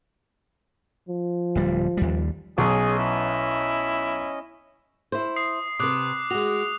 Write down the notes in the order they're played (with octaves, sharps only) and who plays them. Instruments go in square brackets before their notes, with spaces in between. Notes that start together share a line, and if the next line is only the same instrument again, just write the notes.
[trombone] F3
[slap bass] D1 G3
D#2 G3
[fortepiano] B1 [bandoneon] C#4 D#5 [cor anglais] G#4
[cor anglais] E4
[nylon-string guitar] E4 C5
[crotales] D#6 C7
[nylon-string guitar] C3 B4 [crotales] D6 D#6 F#6
[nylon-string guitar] G#3 F#4 [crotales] F7